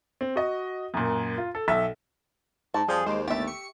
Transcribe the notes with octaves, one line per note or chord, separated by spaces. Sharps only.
C4
F#4 D#5
F#2 A#2
F4
A4
B1 A4 E5
G#2 A5
F2 F3 G3 G#4
D#2 G#3 C5 D6
G1 A3 G4 E5 A6
C#6 C#7